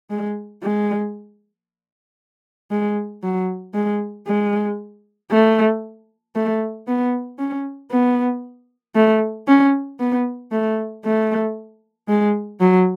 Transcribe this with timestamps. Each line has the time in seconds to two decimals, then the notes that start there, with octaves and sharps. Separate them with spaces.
0.10 G#3
0.63 G#3
2.71 G#3
3.23 F#3
3.74 G#3
4.27 G#3
5.30 A3
6.35 A3
6.87 B3
7.39 C#4
7.91 B3
8.95 A3
9.48 C#4
10.00 B3
10.52 A3
11.04 A3
12.08 G#3
12.60 F#3